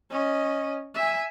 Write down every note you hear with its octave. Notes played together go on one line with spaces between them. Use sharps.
C#4 D#5
E5 G#5